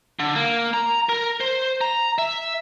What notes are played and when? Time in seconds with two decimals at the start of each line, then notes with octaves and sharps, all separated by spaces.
0.19 D3
0.36 A#3
0.74 A#5
1.09 A#4
1.41 C5
1.81 A#5
2.19 E5